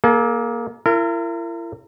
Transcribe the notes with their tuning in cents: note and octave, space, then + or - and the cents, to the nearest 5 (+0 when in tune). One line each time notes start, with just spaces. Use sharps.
A#3 +15 A4 -45
E4 +40 A#4 -30